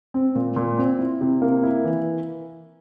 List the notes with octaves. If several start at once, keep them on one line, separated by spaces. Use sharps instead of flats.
C4
A#2
A#2
C4
E4
C3
A#3
E4
E3